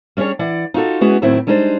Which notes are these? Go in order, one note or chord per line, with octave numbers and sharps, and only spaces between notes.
G3 C#4 D4 G#4 C#5
E3 D5 F#5
D#4 F4 F#4 A4
G#3 B3 C#4 E4 F#4 G#4
E2 A2 D#3 F#3 C4 E4
G3 G#3 D4 D#4 A#4 C5